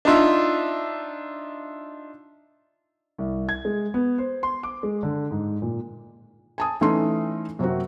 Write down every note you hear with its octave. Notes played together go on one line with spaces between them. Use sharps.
D4 D#4 F4 E5
C2
G#6
G#3
B3
C5
C6
D6
G#3
D3
G#2
A#2
G#5 A5 D#6
E3 A3 C#4 D#4 A4 C6
F#2 C3 A#3 C4 F#4